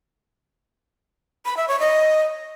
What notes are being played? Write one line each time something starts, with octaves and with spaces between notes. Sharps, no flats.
B5
E5
C#5
D#5